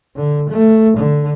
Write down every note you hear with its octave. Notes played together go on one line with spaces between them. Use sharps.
D3
A3
D3